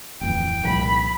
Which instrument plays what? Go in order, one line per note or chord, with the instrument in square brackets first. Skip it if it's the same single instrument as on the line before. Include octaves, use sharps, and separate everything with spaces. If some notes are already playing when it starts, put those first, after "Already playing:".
[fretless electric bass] D1 F2 E3 [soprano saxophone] G5
[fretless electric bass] C2 A#2 F3 [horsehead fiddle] B5